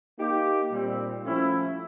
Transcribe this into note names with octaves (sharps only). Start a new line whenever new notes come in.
A#3 D#4 G4
A#2 G3 C4
F3 A3 C#4 E4